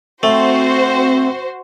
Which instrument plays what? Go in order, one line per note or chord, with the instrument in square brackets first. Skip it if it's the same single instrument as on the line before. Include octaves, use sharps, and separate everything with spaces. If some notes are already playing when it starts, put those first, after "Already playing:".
[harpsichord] A3 [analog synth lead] C4 [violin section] F#4 C5